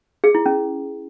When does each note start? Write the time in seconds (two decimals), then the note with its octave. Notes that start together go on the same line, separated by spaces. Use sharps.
0.24 G#4
0.35 E4
0.46 C#4